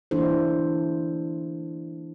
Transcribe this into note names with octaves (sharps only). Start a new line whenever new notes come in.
E3 A#3 D4 E4 A4 C5